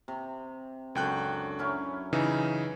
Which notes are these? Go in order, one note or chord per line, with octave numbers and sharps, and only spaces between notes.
C3
C#2 F#2 D3 G5 F#6
F#3 C#4 E4
C#3 E3 D#4